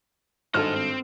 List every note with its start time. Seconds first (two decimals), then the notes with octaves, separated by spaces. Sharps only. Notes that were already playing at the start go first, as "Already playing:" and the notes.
0.54 G#1 G2 D#4 A4 C5 F6
0.76 C4